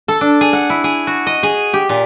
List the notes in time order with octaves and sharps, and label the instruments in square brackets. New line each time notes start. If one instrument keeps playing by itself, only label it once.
[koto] A4
D4
G#4
F#5
E4
G#4
F#4
D#5
G#4
G4
A#2